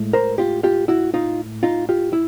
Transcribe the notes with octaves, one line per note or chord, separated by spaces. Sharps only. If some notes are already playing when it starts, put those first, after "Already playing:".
Already playing: A2 G#3
A#4 C5
F4 G4
F4 G4
E4 F#4
D#4 F4
D#4 F4
F4 G4
E4